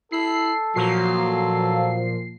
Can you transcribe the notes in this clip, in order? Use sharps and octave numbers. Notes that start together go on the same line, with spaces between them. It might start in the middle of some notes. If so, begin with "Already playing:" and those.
E4 A4 C7
A#2 F3 F#3 C7
A4